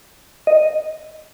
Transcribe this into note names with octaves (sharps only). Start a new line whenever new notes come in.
D#5